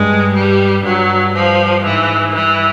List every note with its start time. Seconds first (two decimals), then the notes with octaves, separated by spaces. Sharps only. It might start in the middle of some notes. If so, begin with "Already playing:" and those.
Already playing: G2 G#3
0.34 G3
0.83 G2 F#3
1.34 F3
1.84 G#2 E3
2.34 G2 E3